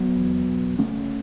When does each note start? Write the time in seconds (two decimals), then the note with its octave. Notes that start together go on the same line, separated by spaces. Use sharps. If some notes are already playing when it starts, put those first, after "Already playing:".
Already playing: F#3 B3
0.17 E2
0.47 E1
0.78 C#3 A3 C#4